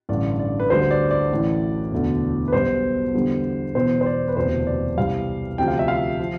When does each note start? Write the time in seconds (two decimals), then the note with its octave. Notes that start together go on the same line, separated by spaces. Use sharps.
0.09 A1 G2 D3 D5
0.39 D5
0.60 B4
0.70 D2 D3 G3 C5
0.91 D5
1.11 D5
1.30 A1 A2 E3
1.91 E1 D2 D3
2.48 B4
2.53 B1 B2 G3 C5
3.14 E2 D3 G3
3.75 E1 E2 B2 C5
4.01 C5
4.06 D5
4.28 B4
4.36 E1 D2 C3 C5
4.67 D5
4.97 C2 C3 G3 F5
5.58 D2 C3 F3 G5
5.68 F5
5.79 E5
5.88 F5
6.19 F3